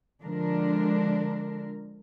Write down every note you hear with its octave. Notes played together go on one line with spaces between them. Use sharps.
D3 F3 G#3 D4 A#4